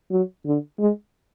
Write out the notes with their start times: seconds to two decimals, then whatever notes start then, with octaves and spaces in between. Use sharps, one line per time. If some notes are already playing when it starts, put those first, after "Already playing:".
0.11 F#3
0.45 D3
0.79 G#3